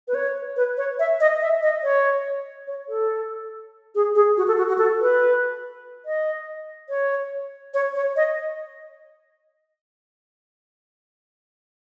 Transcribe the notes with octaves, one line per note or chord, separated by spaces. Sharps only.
B4
C#5
B4
C#5
E5
D#5
E5
D#5
C#5
C#5
A4
G#4
G#4
F#4
A4
F#4
F#4
A4
B4
D#5
C#5
C#5
C#5
D#5